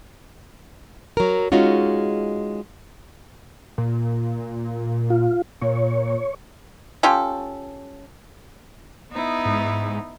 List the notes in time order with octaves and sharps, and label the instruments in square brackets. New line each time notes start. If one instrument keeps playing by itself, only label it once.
[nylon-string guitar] F#3 A#4
G#3 C#4 D#4 F4 F#4
[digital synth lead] A#2
[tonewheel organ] F4
[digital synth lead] A#2 [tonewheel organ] C#5
[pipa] C#4 F4 G4 A4
[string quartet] B3 D#4 E4
[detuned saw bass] G#2